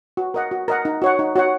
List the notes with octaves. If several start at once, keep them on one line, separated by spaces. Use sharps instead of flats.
F#4
A#4 D#5 F#5
F#4
A#4 D#5 F#5
D#4
F#4 C#5 F#5
D#4
F#4 C#5 F#5